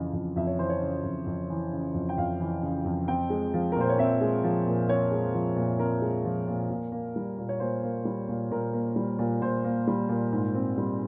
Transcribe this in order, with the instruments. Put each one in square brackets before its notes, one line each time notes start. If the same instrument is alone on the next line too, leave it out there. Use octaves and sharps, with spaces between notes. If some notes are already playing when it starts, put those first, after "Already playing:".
Already playing: [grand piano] F2 C#3 E3
F2
F2 E5
C#5
E3 C5
C#5
C#3
F2
F2
E3
C#3
F2
G5
F2 F5
E3
C#3
F2
C4 G5
G#3
F3
A#4
A#2 C5
C#5
C4 E5
G#3
F3
A#2
C4 C#5
G#3
F3
A#2
C4 A#4
G#3
F3
A#2
A#2
A#3
G3
A#2
C#5
A#2 C5
A#3
G3
A#2
A#2 A#4
A#3
G3
A#2
A#2 C5
A#3
G3
A#2
G#2
C4
G3